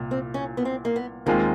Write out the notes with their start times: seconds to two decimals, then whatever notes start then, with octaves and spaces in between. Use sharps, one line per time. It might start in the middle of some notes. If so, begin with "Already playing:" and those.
Already playing: C2 A#2
0.11 C4
0.34 C#4
0.57 B3
0.65 C4
0.85 A#3
0.96 B3
1.26 D#2 D#3 G#3 A#3 C4 F4